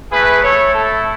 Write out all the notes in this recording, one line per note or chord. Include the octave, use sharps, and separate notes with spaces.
A3 E4 G#4 B4
A4 C#5
A4